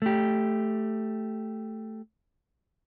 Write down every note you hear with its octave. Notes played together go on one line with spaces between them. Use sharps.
A3 G4